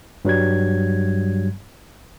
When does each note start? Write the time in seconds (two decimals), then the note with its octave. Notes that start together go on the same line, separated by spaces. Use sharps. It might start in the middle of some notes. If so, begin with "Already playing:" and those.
0.25 G2 F#3 G3 G#6